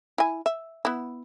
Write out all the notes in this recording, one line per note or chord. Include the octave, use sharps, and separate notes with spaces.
E4 G#5
E5
B3 E4